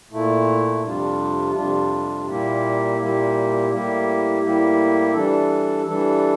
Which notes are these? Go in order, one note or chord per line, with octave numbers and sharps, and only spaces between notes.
A#2 A3 E4
F2 C3 G3 D4 F4
F2 C3 G3 D4 F4
A#2 G3 A#3 E4 G4
A#2 G3 A#3 E4 G4
A2 G3 A#3 E4 G4
A2 G3 A#3 E4 G4
E3 G3 D4 A4
E3 G3 D4 A4